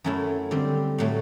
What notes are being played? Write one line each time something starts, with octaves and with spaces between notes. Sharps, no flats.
F#2 F#3 A3 E4
D3 G3 C4
A2 F#3 A3